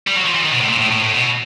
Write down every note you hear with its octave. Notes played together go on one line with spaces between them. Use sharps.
G3
F#3
F3
E3
D#3
B2
A2
A#2
A2
A2
A2
B2